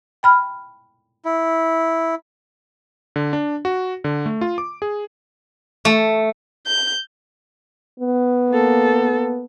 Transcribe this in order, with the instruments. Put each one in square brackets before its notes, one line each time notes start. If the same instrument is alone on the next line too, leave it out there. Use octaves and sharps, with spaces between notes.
[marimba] G5 B5 F6
[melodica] E4
[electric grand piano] D3
D4
F#4
D3
A3
F4
D6
G#4
[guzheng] A3
[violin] G6
[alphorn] B3
[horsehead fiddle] A#3 A4